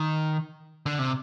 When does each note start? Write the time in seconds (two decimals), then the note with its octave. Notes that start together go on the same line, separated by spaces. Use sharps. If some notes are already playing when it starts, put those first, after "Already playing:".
Already playing: D#3
0.86 D3
0.99 C3